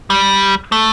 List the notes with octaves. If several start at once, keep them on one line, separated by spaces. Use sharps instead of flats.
G3
A3